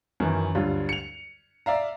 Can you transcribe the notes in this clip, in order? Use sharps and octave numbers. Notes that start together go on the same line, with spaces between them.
F#2 D#3 E3
D2 G2 F#3 F4
C#7 F7
D5 E5 F5 A#5